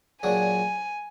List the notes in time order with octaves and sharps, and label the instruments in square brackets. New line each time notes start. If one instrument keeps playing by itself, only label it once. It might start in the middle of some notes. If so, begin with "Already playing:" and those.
[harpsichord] A#2 F#3 D4 G#4 [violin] G#5